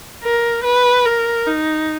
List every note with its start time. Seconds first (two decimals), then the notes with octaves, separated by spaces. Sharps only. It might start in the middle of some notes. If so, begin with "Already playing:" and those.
0.23 A#4
0.64 B4
1.05 A#4
1.47 D#4